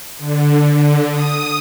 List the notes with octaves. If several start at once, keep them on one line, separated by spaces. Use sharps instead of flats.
D3
D3
D#6